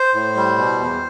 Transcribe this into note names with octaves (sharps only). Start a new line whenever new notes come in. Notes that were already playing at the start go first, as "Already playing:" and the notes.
Already playing: C5
A2
G3
B2
E2